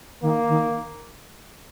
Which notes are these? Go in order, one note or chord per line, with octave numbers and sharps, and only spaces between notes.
D#3 A#3
D#3